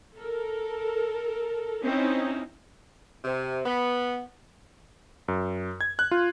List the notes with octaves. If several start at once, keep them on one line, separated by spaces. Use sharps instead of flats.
A4 A#4
C4 C#4 D#4 E4
C3
B3
F#2
G#6
F#6
F4